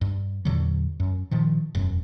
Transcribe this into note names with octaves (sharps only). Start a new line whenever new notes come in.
G2
E2 A#2 D3 F#3
F#2
A#2 D#3 F3
E1 F#2